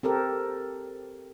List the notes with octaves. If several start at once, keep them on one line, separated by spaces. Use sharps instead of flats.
C4 G4 A4 A#4